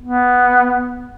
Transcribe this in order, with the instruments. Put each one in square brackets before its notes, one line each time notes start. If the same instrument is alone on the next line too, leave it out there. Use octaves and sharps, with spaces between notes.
[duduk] B3